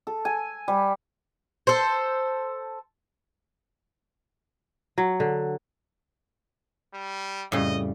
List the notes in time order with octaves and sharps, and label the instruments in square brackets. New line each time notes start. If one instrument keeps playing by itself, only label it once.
[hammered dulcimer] A4
G#5
G3
[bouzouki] A4 C5
[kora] F#3
D3
[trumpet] G3
[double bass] F2 G3 [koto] A2 C#3 [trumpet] D#5